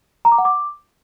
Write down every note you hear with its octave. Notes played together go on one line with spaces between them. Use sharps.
A#5
D6
F#5
D6